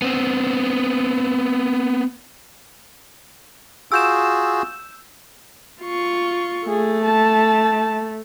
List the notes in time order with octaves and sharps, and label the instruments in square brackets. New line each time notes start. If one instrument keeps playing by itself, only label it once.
[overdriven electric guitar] B3 C4
[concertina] F4 F#4 G#4 [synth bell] E6 G6 E7
[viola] F4 C#6
[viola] A3 [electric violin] G#4
[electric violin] A5